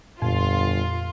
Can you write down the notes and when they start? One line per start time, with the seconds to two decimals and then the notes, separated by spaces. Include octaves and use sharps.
0.22 G1 F2 A#2 F4